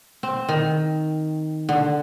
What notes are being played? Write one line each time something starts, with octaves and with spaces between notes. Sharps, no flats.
C4
D#3
D3